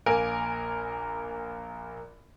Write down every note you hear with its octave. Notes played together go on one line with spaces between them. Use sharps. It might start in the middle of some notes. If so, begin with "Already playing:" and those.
A#1 A#3 A#4 G#5 D7